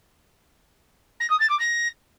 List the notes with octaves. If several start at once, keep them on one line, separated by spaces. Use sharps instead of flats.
A#6
D#6
A6
D6
A#6